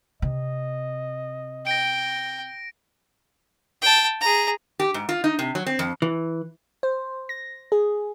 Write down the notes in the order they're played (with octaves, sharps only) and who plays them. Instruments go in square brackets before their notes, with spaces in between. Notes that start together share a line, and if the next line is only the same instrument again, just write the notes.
[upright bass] C3 [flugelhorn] D#5
[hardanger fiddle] G5 [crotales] A#6 D7
[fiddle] G5 A5
G#4 A#5
[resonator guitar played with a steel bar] G4
G#2
F4
D#4
C3
F#3
C4
F2
[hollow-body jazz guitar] E3
[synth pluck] C5
A#6
G#4